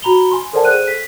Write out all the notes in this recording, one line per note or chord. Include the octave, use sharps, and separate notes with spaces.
F#4 A#5 B5 F7 G7
G#5 C6
A4 A#4 C5 D5 F#5 A5
G#4 A4 C5 G5 F#6 D#7
B6